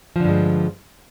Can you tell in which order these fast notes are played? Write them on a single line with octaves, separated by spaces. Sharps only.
F3 D3 G2 G#3